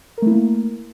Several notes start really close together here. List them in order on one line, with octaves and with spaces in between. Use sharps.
A#4 A3 E4 A#3